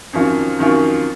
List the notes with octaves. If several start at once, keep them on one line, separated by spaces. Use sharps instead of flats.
F2 D#3 F#3 C#4 F4
F2 D#3 F#3 C#4 F4